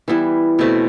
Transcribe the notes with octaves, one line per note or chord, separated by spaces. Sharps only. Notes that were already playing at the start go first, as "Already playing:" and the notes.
E3 G3 B3 E4
B2 A3 C4